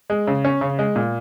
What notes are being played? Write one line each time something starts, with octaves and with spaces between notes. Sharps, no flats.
G#3
C#3
C#4
C#3
G#3
A#2